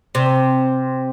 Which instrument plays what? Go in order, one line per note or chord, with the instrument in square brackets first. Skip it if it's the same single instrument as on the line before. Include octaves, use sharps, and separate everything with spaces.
[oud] C3